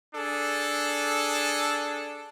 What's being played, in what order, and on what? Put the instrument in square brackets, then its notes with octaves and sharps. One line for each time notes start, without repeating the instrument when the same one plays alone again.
[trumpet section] D4 G#4 A4